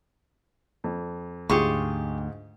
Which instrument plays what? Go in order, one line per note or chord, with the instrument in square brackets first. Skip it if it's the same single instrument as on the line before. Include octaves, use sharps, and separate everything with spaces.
[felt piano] F2
[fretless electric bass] D2 [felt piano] G#2 F4 [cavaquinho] G4 G#4 C#6